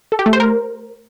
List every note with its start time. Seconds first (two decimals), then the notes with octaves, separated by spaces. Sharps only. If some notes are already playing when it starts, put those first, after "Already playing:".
0.12 A4
0.19 G4
0.26 A3
0.33 C5
0.40 A#4